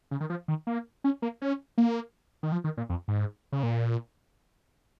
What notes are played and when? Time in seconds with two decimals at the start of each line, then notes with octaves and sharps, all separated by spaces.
0.11 C#3
0.20 D#3
0.30 F3
0.48 D#3
0.67 A#3
1.04 C#4
1.22 A#3
1.42 C#4
1.78 A#3
2.43 D#3
2.52 F3
2.64 D#3
2.77 A#2
2.89 F2
3.08 G#2
3.52 C#3
3.63 A#2